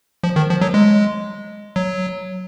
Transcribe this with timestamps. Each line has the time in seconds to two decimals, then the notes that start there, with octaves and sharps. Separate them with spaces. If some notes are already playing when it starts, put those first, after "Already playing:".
0.23 F3
0.36 D#3
0.49 F3
0.61 F#3
0.74 G#3
1.76 F#3